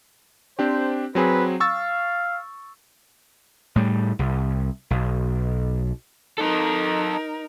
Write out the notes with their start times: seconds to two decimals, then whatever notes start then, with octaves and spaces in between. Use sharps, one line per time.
0.59 C4 D4 G4 C5
1.15 F#3 C4 G#4 B4
1.60 F5 C#6 E6 A6
3.76 A2 G3
4.19 C2
4.90 B1
6.38 D#4 A4 A#4 D#5